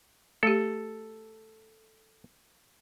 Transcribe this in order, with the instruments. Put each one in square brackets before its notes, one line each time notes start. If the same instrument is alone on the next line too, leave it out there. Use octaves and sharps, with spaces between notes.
[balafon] A3 G4 [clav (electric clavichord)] A4